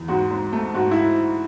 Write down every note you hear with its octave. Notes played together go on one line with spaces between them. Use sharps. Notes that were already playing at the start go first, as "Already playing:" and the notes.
Already playing: E2
G#2 F#4
G#2
A3
G#2 F#4
E4